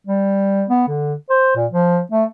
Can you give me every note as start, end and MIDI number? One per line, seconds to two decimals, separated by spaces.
0.07 0.64 55
0.70 0.85 59
0.88 1.14 50
1.30 1.54 72
1.56 1.66 46
1.72 2.00 53
2.11 2.24 57